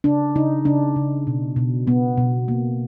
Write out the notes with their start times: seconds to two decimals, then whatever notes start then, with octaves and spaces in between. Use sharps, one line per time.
0.04 C#3 D4
0.35 C#3 D#4
0.65 C#3 D4
0.96 C#3
1.27 B2
1.56 B2
1.87 B2 B3
2.18 B2
2.48 A#3